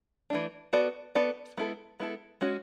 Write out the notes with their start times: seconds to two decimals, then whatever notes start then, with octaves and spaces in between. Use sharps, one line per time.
0.30 E3 A3 D4
0.73 B3 F#4 A4 D5
1.15 B3 F#4 A4 D5
1.57 G#3 B3 E4 A4
2.00 G#3 B3 E4 A4
2.41 G#3 C#4 F#4